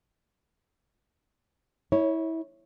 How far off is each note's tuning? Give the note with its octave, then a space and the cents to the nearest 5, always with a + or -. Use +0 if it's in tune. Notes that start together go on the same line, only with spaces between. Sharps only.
E4 -25 C#5 +0